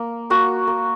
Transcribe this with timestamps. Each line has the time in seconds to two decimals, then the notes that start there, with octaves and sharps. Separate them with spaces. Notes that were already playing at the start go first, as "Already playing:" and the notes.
Already playing: A#3
0.30 A#3 F#4
0.67 A#3